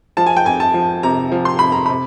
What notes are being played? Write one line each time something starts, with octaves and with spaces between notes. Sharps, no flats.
F3 A5
G#5
G5
F2 G#5
A5
F3
C3 A#5
F3
C6
F2 B5
A#5
C3 B5